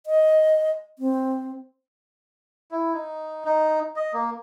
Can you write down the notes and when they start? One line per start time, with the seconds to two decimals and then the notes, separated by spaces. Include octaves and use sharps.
0.06 D#5
0.99 C4
2.71 E4
2.94 D#4
3.45 D#4
3.96 D#5
4.14 A#3